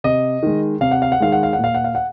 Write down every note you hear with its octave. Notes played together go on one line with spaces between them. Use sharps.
C3 D#5
D#3 G#3
C3 F5
F#5
F5
F#5
D#3 G#3 F5
F#5
F5
F#5
A#2
F5
F#5
F5
F#5